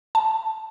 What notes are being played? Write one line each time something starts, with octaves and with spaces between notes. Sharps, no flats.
A5